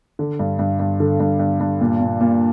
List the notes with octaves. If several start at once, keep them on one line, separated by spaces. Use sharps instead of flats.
D3
G2
G2
G2
D3
G2
G2
G2
A#2
A#2
A#2